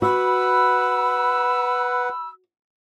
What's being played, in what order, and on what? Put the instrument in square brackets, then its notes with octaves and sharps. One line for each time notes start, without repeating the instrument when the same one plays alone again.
[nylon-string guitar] F#4 [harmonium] B4 F#5 [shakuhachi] B5 [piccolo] E6